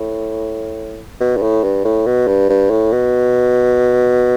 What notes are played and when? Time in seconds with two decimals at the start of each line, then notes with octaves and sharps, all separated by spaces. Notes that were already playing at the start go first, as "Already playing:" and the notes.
Already playing: A2
1.21 B2
1.37 G2
1.42 A2
1.64 G2
1.84 A2
2.07 B2
2.28 G2
2.49 G2
2.71 A2
2.92 B2